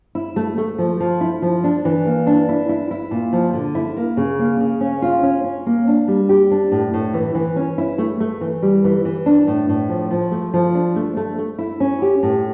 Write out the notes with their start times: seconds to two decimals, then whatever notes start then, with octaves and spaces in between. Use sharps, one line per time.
0.15 E4
0.36 A3
0.58 A3
0.78 F3
1.00 F3
1.21 E4
1.42 F3
1.64 D4
1.85 E3
2.06 A#3
2.27 D4
2.49 E4
2.69 E4
2.91 E4
3.11 A#2
3.33 F3
3.53 D3
3.75 E4
3.97 A#3
4.17 C#3
4.39 A#3
4.60 C#3
4.81 C#4
5.02 F4
5.23 C#4
5.44 C#4
5.66 A#3
5.88 D4
6.08 G3
6.29 G4
6.51 D4
6.72 A2
6.94 A2
7.14 E3
7.35 E3
7.56 C#4
7.78 E4
7.98 A3
8.20 A3
8.41 E3
8.62 G3
8.84 E3
9.05 E3
9.26 D4
9.47 A2
9.69 A2
9.89 F3
10.11 F3
10.31 A3
10.54 F3
10.75 D4
10.96 A3
11.17 A3
11.38 A3
11.59 E4
11.80 C#4
12.02 G4
12.23 A2